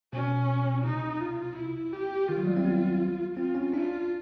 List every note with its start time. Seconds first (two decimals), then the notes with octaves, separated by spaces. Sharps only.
0.13 B2 C#4
0.85 C3 D#4
1.21 F4
1.57 E4
1.93 G4
2.29 D#3 F4
2.38 F#3
2.47 G3
2.57 C4
2.65 B3
3.37 C4 F4
3.55 C#4
3.73 D4 F4